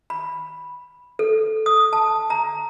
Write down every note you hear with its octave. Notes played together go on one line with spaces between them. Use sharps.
B5
A4
D#6
A5
A#5